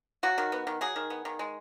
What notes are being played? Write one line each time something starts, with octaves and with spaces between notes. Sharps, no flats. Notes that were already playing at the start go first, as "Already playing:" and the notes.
F#3 F#4
D#3
B3
D#3
F#3 G#4
D#3
B3
D#3
G#3